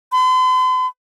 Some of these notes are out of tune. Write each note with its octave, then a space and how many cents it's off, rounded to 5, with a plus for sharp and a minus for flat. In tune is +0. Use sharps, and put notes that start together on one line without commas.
C6 -45